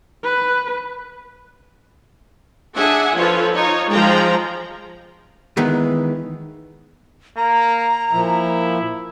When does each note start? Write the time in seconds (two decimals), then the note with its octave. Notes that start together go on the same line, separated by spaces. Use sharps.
0.24 B4
2.77 D4 G#4 E5 F#5 G#5
3.15 F3 F4 A4 B4 C#5
3.53 D#4 F4 C#5
3.91 F3 G#3 G5 A#5
5.57 D#3 E3 G#3 B3
7.37 A#3 A#5
8.13 A#2 F3 E4